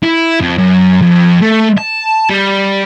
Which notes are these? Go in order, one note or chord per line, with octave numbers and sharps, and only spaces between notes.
E4
F2
F#2
F2
A3
A5
G3